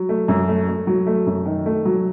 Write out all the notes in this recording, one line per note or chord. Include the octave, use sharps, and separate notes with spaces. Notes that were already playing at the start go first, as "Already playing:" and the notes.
Already playing: F#3
A3
F#2
A3
A3
F#3
A3
F#2
D#3
A3
F#3